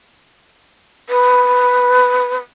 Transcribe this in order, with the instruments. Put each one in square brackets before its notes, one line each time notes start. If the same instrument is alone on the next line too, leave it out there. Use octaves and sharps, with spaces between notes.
[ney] B4